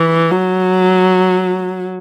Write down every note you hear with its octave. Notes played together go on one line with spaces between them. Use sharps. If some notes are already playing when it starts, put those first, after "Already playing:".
Already playing: E3
F#3